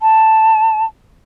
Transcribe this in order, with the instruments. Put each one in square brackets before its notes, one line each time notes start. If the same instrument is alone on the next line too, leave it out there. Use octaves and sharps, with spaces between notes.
[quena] A5